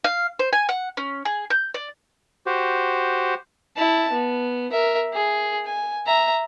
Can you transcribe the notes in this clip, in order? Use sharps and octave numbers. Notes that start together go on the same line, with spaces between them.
F5
C5
G#5
F#5
C#4
G#4
G6
D5
F#4 G4 C5
E4 A5
B3
A#4 E5
G#4
G#5
E5 A#5